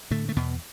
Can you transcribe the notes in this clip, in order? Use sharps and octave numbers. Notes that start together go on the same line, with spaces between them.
A2 D3 A3
A3
E2 B2 B3